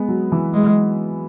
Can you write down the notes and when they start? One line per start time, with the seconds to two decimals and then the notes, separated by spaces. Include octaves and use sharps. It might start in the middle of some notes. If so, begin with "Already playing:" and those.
Already playing: G#3 B3
0.08 F#3
0.32 E3
0.54 G#3